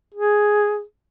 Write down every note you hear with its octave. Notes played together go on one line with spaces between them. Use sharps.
G#4